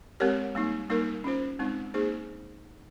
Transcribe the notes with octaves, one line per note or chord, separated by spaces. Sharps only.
G#3 C4 G4 A#4 C#5
G3 A#3 D#4
G3 A#3 D#4 A#4
C#4 F4 C5
G#3 C4 D#4
A#3 D#4 G#4 C5